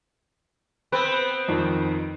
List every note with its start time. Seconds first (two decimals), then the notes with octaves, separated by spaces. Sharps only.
0.92 B3 C4 B4
1.48 F2 D#3